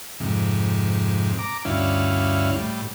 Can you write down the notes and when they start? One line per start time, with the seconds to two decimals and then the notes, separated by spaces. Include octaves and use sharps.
0.20 F2 G#2 C3
1.39 A#5 D6
1.65 D2 G2 C#4 E4 F5
2.55 A2 G3